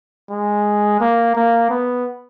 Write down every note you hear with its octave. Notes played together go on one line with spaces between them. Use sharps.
G#3
A#3
A#3
B3